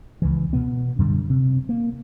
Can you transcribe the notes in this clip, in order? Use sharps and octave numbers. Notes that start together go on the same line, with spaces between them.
C#2 E3
B2 B3
F#2 D3 G3
C3
A#3